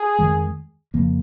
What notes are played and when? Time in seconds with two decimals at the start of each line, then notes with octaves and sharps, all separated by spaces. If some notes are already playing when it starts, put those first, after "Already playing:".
Already playing: G#4
0.19 F2 D#3 G#3
0.94 F2 C#3 F3 A#3